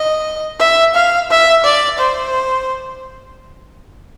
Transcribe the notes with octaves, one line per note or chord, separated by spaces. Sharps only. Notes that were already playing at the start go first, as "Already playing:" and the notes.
Already playing: D#5
E5
F5
E5
D5
C5